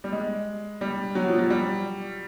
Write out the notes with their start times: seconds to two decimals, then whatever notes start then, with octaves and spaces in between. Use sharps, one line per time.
0.04 G3
0.12 G#3
0.81 G3
1.15 F#3
1.28 F3
1.39 F#3
1.50 G3